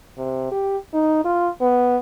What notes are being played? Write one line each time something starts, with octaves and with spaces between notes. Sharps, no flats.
C3
G4
D#4
F4
B3